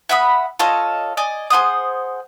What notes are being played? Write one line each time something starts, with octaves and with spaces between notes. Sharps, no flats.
E5 F#5 B5 D#6
F4 A4 C#5 D#5
D5 D#5 G#5
G#4 C5 F#5 D#6